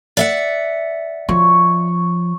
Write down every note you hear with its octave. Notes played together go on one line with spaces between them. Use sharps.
D5 E5 F#5
F3 C#5